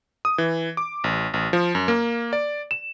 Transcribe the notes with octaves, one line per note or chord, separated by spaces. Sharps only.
D#6
E3
D6
A1
A1
F3
F#2
A#3
D5
E7